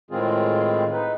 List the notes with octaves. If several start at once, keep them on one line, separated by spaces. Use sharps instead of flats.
A2 D#3 G#3 C4 F4 G#4
D#4 B4